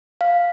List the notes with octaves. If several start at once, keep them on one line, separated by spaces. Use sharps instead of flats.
F5